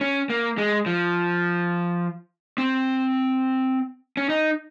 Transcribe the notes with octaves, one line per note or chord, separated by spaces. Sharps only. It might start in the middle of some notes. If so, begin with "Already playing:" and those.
C#4
A#3
G#3
F3
C4
C#4
D#4